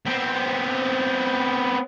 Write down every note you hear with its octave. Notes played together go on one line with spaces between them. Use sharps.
B3 C4